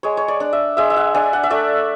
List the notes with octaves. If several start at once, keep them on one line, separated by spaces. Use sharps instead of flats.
G#3 C#5
C#5
D5
D4
E5
G#3 E5
E5
F#5
D4 G#5
F#5
E5
A3 D5